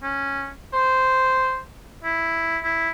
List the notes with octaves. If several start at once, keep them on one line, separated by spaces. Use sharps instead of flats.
C#4
C5
E4
E4